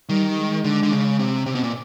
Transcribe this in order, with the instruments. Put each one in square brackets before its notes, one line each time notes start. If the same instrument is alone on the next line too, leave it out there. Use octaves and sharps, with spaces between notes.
[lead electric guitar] D#3 [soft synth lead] G3
[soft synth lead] G3
G#3
[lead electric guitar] D3 [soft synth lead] G#3
[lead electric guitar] D3
C#3
C3
C3
B2
A#2